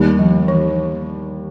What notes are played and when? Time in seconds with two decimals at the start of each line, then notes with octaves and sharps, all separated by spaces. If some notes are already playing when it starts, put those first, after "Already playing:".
Already playing: D#2 D#3 G3
0.19 F3
0.48 E3